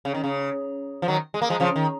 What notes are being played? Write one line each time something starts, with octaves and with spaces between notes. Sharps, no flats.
C#3
D#3
C#3
F3
D#3 F#3
G#3
A#3
F3 G#3
C#3 F3
D#3